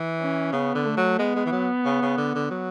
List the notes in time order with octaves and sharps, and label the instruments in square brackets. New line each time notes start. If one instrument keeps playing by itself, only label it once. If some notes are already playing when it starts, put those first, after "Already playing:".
Already playing: [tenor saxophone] E3
[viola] C#4
[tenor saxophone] C#3 [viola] B3
[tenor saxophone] D3
[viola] A3
[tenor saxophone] F#3
[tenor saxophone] G#3 [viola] B3
[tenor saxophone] G#3
E3
F#3
C#3
C#3
D3
D3
F#3